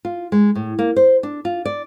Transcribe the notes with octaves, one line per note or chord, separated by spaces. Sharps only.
F4
G#3
A2
A#3
C5
D4
F4
D5